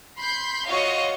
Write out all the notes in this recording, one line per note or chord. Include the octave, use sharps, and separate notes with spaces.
B5 C6 G6
F4 F#4 C#5 D#5 F5 C#6